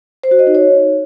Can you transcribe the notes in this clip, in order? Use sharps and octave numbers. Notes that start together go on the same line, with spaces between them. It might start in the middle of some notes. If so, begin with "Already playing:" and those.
C5
F#4
D#5
D#4
C#5